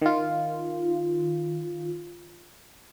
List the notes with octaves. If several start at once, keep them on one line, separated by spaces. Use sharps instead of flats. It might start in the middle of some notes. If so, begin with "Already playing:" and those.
D#3 F4